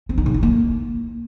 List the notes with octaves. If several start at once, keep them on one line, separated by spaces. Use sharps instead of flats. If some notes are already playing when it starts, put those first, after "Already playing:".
C4
D#4
C#3
E4
A#3